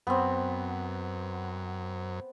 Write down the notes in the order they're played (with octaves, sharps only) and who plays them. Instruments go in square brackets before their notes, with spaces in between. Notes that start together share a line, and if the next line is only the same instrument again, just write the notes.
[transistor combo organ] F#2 [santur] B3 C4